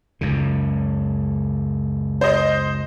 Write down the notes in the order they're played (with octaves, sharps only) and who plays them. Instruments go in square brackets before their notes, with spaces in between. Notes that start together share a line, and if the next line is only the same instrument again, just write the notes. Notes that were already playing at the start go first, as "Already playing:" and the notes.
[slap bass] C#2 F#2 C#3
[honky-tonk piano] C5 D#5